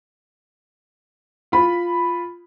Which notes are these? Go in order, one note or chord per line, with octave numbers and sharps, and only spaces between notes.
F4 B5